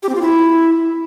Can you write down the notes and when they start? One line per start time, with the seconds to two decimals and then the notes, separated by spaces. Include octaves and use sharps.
0.03 G4
0.09 C4
0.15 F4
0.21 E4